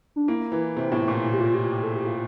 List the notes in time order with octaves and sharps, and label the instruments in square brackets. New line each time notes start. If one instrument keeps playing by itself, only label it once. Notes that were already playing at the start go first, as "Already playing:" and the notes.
[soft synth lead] D4
[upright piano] A#3 [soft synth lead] E4
[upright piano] E3
C3
A2
A#2
[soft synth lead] G4
F4
G4
G4
A4
G4
F4